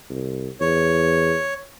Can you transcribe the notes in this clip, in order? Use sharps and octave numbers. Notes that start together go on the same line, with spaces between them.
C2
E2 C#5